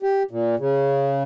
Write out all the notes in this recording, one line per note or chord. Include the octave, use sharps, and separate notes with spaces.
G4
A#2
C#3